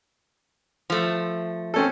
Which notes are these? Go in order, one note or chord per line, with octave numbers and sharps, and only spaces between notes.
F3 A3
C4 C#4 A4